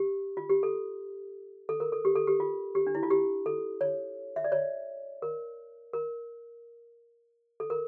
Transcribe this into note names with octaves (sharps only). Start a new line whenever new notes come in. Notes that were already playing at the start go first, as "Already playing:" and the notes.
Already playing: G4
F4
G4
A4
A4
A#4
A4
G4
A4
G4
F4
G4
D4
E4
F4
G4
A4
C#5
E5
D5
C#5
A#4
A#4
A4
A#4